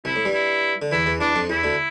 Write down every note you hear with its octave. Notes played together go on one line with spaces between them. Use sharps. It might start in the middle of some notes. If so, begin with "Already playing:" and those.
C2 C3 E4
A2
G2 G3
E4
D3
E2 E3 E4
E2 E3
E2 E3 D4
F2 F3
E2 E3 E4
D2 D3